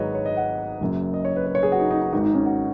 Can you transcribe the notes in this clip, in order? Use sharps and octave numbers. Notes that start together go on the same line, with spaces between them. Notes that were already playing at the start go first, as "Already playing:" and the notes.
Already playing: G#1 G#2 F#3 G#4 B4 C#5 D#5
C#5
D#5
F#5
F#1 F#2 C#3
D#5
C#5
B4
B4
C#5
G#4
F#4
D#4
D#4
D#4
G#1 G#2 D#3 F#4
D#4
C#4
F#4